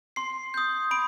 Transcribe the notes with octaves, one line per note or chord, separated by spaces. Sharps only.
C6 C7
D#6 G6
B5 D7